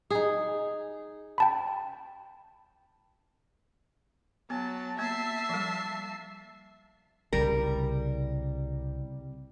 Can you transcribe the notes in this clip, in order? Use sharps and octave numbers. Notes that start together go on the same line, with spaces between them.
D#4 G#4
G5 A5 B5
F#3 B3 A5
A#3 E5 A5 C7
F3 G3
C2 C#3 G3 C4 A#4